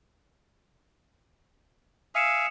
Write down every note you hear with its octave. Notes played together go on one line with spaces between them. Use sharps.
E5 F5 G#5 D#6 C#7 E7